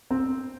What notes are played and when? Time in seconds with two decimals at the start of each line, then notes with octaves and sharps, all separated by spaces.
0.11 C4